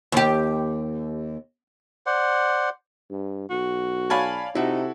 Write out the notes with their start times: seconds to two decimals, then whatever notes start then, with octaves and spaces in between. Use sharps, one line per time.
0.12 D#2 G4
2.06 C5 D5 F#5
3.11 G2
3.50 B1 F#4
4.10 C#5 D5 F5 G#5 A5 B5
4.55 C3 D#4 E4 F#4 A4